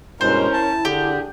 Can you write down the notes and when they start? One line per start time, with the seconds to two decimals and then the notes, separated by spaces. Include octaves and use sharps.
0.21 G2 B2 G#3 C#4 E4 A#4 C5
0.53 A5
0.85 D3 D4 G4 G#4